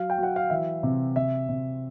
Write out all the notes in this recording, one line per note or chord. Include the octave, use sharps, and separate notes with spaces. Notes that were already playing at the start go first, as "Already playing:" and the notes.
Already playing: F#3 F5
G5
F#3 F#5
F5
E3 E5
C3
C3 E5
C3